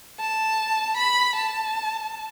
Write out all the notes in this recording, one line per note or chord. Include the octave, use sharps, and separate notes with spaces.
A5
B5
A5